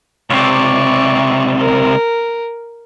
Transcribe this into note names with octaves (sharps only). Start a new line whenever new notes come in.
C#2 C3 D5 C#6
A#4